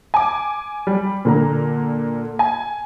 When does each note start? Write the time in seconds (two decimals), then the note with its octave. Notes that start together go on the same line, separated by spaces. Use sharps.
0.14 G#5 D6
0.87 G3
1.25 A#2 D3 A#5
2.39 G#5